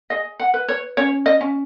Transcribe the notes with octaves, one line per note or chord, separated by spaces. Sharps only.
G#4 D#5
F#5
B4
C#5
C#4 C#5
D#5
C#4